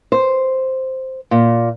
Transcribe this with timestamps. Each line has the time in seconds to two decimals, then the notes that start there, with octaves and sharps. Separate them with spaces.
0.12 C5
1.31 A#2